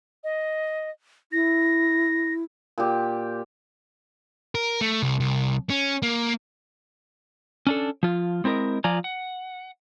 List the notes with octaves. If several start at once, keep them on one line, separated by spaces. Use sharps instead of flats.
D#5
E4 A#6
A#2 G4
A#4
A3
C2
C2
C#4
A#3
C#4 D4 A4
F3 F4
G#3 C4 E4 A#4 D#5
F3 F4 D5 G#5 A#5
F#5